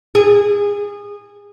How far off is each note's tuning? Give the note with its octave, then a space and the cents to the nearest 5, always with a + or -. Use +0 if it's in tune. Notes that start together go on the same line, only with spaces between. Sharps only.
G#4 -25